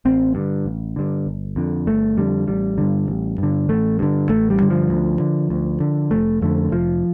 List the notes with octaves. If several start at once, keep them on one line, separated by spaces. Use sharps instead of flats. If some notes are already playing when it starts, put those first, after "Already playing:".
A1 C4
G2 D3
A1
G2 D3
G1
F2 D3
G1 A3
F2 D3 G3
A1 G3
G2 D3
A1
G2 D3
A1 A3
G2 D3
A1 A3
G3
G2 D3
F3
D2
D3
D2
D3
F1 A3
F2 D3 A3
F1 F3